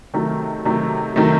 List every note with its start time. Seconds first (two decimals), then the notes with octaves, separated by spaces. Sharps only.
0.14 C3 D#3 F#3 A3
0.65 C3 D#3 F#3 A3
1.16 C3 D#3 F#3 A3